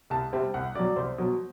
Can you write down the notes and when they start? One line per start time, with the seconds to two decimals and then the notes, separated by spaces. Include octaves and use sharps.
0.10 C2 A5
0.33 C3 G3 C4
0.54 C2 F#5
0.75 B2 F#3 D5
0.96 C2 C5
1.18 B2 F#3